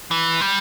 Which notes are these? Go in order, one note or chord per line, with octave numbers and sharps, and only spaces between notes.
E3
G3